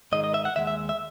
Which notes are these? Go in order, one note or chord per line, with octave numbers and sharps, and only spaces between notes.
G#2 D#3 G#3 D#5
D#5
E5
F#5
D#2 D#3 G#3 E5
E5
E5